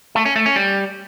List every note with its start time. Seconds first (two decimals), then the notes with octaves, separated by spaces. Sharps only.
0.15 A3
0.25 C#4
0.36 A3
0.46 C#4
0.56 G3